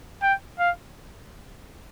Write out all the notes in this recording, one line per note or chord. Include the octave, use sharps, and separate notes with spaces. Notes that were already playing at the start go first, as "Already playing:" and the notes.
G5
F5